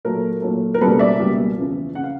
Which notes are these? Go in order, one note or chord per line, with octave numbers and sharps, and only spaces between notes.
A#2 F#3 A3 A#4
A#2 F#3 A3
A#4
C#2 B2 G3 A#3 A4 B4
D5 E5
C#2 B2 G3 A#3
E2 C#3 F3
C#3 F3 F#5
F5